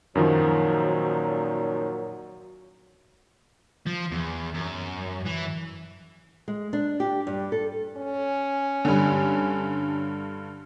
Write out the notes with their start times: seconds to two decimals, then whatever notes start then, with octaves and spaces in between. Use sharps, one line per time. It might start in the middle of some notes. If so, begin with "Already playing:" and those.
0.15 F#2 A#2 D#3 F3 F#3
3.87 F3
4.12 E2
4.54 F#2
5.25 E3
6.48 G#3
6.73 D4
7.00 G4
7.27 G2
7.52 A4
7.97 C#4
8.85 G2 D3